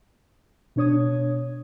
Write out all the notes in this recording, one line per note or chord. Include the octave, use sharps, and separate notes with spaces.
B2 D4 C#5 D#6 G#6